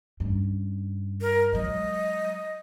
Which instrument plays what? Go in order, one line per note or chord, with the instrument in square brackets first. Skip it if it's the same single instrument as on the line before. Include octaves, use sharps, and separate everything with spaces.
[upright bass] G2 C#4
[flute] A#4
[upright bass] F#3 G#3 [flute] D#5